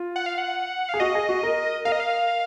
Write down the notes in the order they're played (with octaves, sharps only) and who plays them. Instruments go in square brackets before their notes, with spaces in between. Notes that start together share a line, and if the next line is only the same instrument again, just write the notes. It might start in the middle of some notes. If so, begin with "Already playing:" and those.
Already playing: [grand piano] F4
[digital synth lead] F#5
F5
F#5
[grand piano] G#4 [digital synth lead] F5
[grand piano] F#4 [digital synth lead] D#5
[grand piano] G#4
F#4
A#4
[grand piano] A#4 [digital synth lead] F5
[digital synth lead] D#5
F5